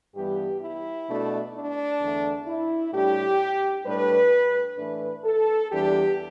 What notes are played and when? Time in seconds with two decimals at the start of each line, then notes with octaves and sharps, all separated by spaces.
0.15 G2 E3 G3 B3 G4
0.62 E4
1.08 B2 A3 D4
1.55 D4
2.01 E2 D3 A3
2.47 E4
2.93 A2 G3 D4 G4
3.85 A2 G3 D4 B4
4.78 A2 E3 A3 D4 B4
5.24 A4
5.71 E2 E3 G3 D4 G4